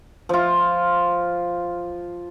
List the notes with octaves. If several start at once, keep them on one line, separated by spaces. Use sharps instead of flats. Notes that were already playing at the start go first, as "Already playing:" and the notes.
F3 F4